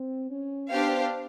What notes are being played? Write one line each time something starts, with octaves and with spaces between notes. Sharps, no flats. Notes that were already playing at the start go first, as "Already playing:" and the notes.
Already playing: C4
C#4
B3 D4 G4 C5 F5